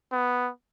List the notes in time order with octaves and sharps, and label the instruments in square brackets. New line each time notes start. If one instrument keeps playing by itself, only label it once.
[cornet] B3